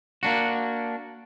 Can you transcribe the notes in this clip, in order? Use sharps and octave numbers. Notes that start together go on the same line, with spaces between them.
A#3 D4 F#4